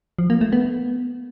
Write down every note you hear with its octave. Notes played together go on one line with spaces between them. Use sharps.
F3
A#3
A3
B3